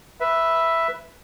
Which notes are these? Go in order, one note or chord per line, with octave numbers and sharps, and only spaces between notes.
B4 E5